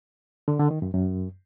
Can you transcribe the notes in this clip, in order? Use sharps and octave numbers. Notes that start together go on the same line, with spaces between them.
D3
D3
D#3
F#2
F#2